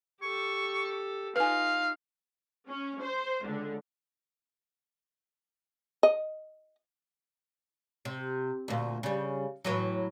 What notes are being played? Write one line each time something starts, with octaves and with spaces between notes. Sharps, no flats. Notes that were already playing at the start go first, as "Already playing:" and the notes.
G4 A4 C#6
D#4 F4 B4 F5 G#5
C#4
C5
C#2 D3
D#5
C3
D2 A#2
C#3 G3
A2 E3 F#3